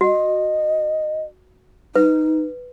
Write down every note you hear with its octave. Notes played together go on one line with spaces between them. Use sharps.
F#4 D#5
D#4 B4